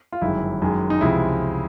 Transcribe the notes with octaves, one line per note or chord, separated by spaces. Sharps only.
F4
G1 F#2 D#3 G#3 E4
F#2 D#3 G#3
D#4
C#2 C3 F3 G#3 E4